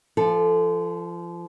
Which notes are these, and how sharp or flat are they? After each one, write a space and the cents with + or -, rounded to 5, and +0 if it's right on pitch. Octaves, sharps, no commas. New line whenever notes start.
F3 -25 A4 +0